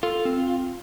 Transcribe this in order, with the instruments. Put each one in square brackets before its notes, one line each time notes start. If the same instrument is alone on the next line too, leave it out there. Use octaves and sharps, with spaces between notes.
[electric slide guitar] F4 [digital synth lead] A4
[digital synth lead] C4